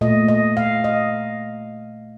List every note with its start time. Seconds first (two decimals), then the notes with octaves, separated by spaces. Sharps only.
0.01 A#2 A3 D#5
0.28 D#5
0.57 F5
0.84 D#5